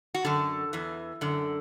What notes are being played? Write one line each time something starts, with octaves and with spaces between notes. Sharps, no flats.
F#4
F#2 D3 A4
E2 E3
F#2 D3